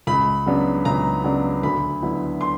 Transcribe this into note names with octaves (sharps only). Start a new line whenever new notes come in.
C#2 B5
C#3 F#3 B3 D4
C#2 A#5
C#3 F#3 B3 D4
D2 B5
D3 F#3 B3 E4
C6